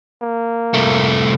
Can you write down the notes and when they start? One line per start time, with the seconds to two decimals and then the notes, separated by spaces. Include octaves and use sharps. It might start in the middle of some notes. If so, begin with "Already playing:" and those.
0.22 A#3
0.74 C2 A3